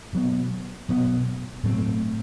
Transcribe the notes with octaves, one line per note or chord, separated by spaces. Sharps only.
B2 F#3 B3
B2 F#3 B3
A2 F#3 A3 C4